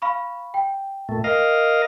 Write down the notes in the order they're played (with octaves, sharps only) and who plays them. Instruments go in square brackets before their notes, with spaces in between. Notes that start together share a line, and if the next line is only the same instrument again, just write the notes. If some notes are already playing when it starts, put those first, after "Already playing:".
[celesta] F5 B5 C#6
G5
[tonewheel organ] A#2 A3
A#4 D#5 F5